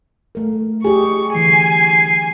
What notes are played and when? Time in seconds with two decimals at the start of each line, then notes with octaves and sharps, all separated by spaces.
0.35 A3 A#4
0.85 G4 G#4 C#6
1.34 D3 E3 F#3 G#5 C7